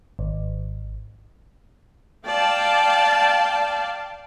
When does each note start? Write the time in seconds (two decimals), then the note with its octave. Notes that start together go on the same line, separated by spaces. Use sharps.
0.19 G#1
2.25 D5 F5 G5 A5